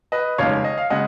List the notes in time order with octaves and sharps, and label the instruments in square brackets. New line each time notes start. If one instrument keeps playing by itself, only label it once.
[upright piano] B4 D#5
F1 D#2 C#3 G#3 C#5 F5
D#5
F5
C#3 G#3 D#5 F#5